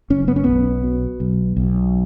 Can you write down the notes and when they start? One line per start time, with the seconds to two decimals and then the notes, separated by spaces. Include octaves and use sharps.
0.10 F#1 C#4
0.28 B3
0.36 C#4
0.44 B1 B3
0.83 B2
1.20 B1
1.57 B1